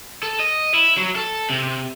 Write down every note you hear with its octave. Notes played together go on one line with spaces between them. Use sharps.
A4
D#5
E4
F#3
A4
C3